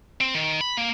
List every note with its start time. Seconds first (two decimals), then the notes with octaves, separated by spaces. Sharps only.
0.21 C4
0.35 D#3
0.61 B5
0.77 A#3